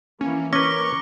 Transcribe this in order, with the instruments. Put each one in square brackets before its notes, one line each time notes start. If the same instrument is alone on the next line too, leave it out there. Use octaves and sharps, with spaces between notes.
[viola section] E3 A#3 [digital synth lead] C#4
[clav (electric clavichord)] C#4 B4 [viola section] A#4 [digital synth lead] C#6 [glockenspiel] D6 A#6 G7